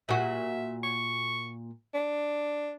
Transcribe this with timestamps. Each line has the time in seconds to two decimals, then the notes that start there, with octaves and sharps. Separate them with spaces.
0.09 A#2 F#4 E5
0.84 C#6
1.94 D4